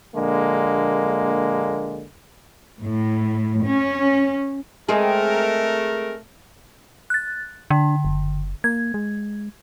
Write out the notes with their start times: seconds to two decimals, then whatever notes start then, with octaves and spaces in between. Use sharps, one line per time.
0.15 A#1 D3 G#3 A#3
2.82 A2
3.64 C#4
4.89 G#3 A3 C4 G#4 A#4
7.10 F#6 A6
7.70 D3 D4
8.05 F#1
8.64 A#3 G#6
8.94 G#3